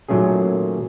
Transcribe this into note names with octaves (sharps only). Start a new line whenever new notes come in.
A#2 D#3 F#3 A3 C#4 G#4